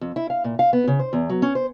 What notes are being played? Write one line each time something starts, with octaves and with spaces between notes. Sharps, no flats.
F2
E4
F5
A#2
F5
B3
C#3
C5
E2
F#3
C#4
C5